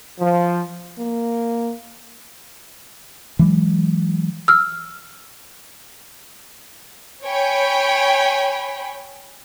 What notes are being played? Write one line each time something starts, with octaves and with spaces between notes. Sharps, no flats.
F3
A#3
E3 F#3 G#3
E6 F6
C#5 G5 G#5 B5